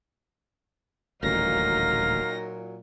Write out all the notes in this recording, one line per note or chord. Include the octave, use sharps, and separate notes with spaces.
D#1 A1 D2 A#2 F#3 D#4 F5 A#6